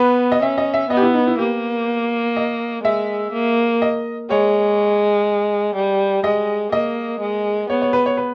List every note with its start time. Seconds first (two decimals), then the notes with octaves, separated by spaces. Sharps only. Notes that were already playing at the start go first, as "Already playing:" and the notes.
Already playing: B3 B4
0.32 D#5
0.42 C#4 E5
0.58 D#5
0.74 E5
0.90 B3 D#5
0.97 G4
1.02 E4
1.14 D#4
1.27 E4
1.38 A#3 G4
2.36 D#5
2.84 G#3 E5
3.33 A#3
3.82 D#5
4.30 G#3 C#5
5.76 G3
6.24 G#3 D#5
6.72 A#3 D#5
7.21 G#3
7.70 B3 C#5
7.82 C#5
7.93 B4
8.06 C#5
8.17 B4